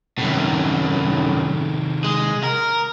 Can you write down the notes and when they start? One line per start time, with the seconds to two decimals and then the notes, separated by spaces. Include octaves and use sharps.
0.18 F#2 A2 C3 D#3
2.04 G#3
2.44 A#4